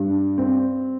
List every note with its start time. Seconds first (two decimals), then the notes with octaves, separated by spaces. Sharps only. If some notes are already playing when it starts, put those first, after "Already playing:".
Already playing: G2
0.38 C4